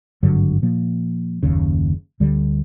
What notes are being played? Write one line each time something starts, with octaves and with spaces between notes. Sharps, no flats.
G#1 G2 D3 F#3
A#2 F3 A#3
F#1 D#2 C#3
D2 D3 G3